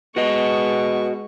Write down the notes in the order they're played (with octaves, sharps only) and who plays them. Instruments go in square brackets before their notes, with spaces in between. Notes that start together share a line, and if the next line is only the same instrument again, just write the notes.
[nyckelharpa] G#3 C#6 [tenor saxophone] B3 [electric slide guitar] F#4 D#5